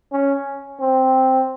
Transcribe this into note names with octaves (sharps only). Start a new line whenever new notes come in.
C#4
C4